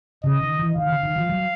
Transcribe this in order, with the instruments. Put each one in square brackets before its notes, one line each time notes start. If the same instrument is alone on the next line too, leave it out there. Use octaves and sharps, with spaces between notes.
[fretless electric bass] C#3 [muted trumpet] D#5
[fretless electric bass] D#3
E3
[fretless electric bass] D#3 [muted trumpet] F5
[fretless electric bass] D3
D#3
F3
F#3